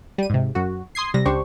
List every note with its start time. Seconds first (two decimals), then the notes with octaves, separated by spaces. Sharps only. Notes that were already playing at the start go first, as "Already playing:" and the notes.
0.18 G3 D#7
0.30 G#2 C3
0.55 F#2 F#4
0.95 C6 D#6 G#6 C7
1.14 C3 G3 A#6
1.25 C#2 D4 G4 C5 C#6